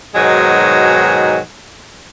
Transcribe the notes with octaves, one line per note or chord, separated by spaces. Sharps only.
G#2 B2 D#3 F#3 G#3